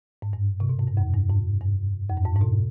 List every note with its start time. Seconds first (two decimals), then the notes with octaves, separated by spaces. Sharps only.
0.22 G#2
0.33 G2
0.60 C3
0.69 B2
0.79 G#2
0.88 G2
0.97 F2
1.14 G2
1.30 G#2
1.61 G2
2.09 F2
2.17 G2
2.25 G#2
2.36 G#2
2.41 B2